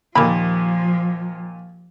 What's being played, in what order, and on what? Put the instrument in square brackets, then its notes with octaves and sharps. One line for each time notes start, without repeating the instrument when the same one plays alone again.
[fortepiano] D#2 A#2 [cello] F3 [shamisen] A#4 B5